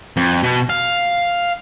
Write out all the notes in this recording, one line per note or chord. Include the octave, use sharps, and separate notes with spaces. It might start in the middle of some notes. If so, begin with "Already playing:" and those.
F2
B2
F5